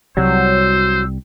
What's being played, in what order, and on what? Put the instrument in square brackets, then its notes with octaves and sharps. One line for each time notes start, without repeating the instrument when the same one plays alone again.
[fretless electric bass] C2 G3 [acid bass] F#3 [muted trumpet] C5 [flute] E6